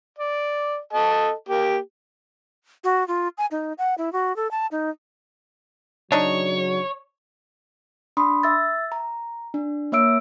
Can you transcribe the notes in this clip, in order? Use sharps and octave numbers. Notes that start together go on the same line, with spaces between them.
D5
A4 D#5 A5
A#3 G4
F#4
F4
G#5
D#4
F#5
E4
F#4
A4
A5
D#4
C#3 F#3 D4 D#4 C#5
D4 B5 C6 D#6
E5 E6 A6
A#5
D4
A#3 C#5 E5 E6 D7